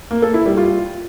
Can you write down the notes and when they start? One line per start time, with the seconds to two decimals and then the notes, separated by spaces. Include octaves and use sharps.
0.11 A#3
0.22 A4
0.34 E4
0.46 G3
0.57 F4